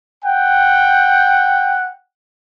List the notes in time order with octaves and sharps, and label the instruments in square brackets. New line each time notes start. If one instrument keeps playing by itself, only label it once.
[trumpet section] F#5 G5